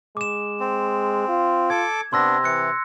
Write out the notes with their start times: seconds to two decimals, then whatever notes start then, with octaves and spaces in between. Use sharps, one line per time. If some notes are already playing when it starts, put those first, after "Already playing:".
0.17 G#3 D6 E7
0.60 C4
1.28 F4
1.70 A4 D6 G#6
2.13 C3 B3 D4 C6 E6 A#6
2.44 E3 F#6 C#7